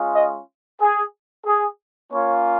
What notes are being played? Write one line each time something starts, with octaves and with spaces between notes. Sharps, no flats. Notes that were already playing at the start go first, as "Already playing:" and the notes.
Already playing: G#3 C#4 F4
D#5
G#4
G#4
A#3 C#4 F4 C#5